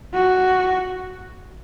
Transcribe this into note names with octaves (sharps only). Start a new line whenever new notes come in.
F#4